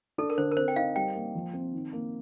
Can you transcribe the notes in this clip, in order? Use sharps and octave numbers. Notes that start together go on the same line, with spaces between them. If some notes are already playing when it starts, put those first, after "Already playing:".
D4 A4
A#4
D3 C5
A#4
C4 C5
G5
D#4 F5
G3 G5
A#3
F3
C4
D#3
A#3